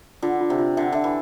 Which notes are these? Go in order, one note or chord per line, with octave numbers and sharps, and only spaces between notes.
D3 F4
F4
C3
F4
D3 E5
D3 E5
E3